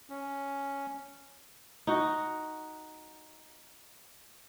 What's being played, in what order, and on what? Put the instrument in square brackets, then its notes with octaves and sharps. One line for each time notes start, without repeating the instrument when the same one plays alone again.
[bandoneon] C#4
[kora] D#4 F#4